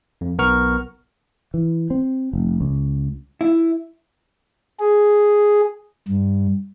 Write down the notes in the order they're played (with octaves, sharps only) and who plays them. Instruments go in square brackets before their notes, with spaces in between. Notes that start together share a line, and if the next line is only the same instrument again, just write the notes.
[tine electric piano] F2
B1 B3 A#4 C#6 F6
[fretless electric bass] E3
C4
F1
C#2
[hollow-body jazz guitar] E4
[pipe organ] G#4
G2